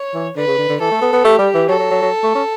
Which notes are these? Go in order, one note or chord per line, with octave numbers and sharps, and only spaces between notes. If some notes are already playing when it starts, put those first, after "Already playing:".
Already playing: C#5
E3
D3 B4
C#3
D3
D3
E3 A4
A3
B3
B3
A3 G4
G3
E3
F#3 A4
F#3
F#3
F#3
A3
C#4